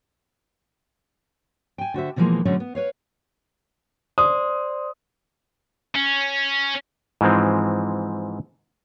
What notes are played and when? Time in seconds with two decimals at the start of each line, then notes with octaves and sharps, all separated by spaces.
1.78 G5 G#5
1.94 D3 F#4 C5 E5
2.16 B2 D3 E3 F3 G#3 A#3
2.45 B2 D3 F#3 G#3 A3 C#4
2.60 B3
2.75 B4 C#5 F5
4.18 C5 D5 C6 D#6
5.95 C#4
7.21 G#2 E3 F3 G#3 C4